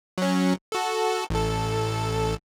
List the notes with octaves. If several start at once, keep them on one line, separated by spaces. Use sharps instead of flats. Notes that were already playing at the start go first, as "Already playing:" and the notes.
F#3 C#4
F#4 A4
A1 A4